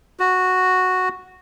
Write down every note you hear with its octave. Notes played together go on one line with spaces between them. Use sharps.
F#4